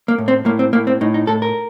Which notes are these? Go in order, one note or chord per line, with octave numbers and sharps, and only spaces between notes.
A#3
A2
C4
A2 A#3
C4
A2 A#3
C4
A2 D#4
D#4
A2 A4
A#4